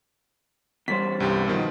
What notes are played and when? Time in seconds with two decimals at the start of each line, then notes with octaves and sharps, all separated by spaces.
0.88 E2 G3 C5 B6
1.20 C2 G2 G4
1.48 B2 D#3 F3